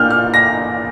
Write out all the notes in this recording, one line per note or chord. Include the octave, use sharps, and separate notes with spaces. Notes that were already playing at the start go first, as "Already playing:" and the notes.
Already playing: A#2 A#3 D4 F6 G6
F6
A#6